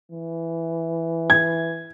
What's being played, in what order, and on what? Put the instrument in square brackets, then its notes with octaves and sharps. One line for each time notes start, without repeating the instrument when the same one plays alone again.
[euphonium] E3
[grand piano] G#6